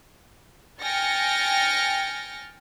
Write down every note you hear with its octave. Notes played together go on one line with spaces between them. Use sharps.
G5 G#5 F6 A6 A#6 C#7